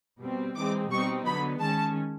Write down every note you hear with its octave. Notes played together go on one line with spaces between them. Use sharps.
B2 G3 C4
E3 G#3 C4 D#4 D6
B2 G3 C4 D#4 C#6
D3 F#3 B3 B5
D#3 G#3 C#4 A5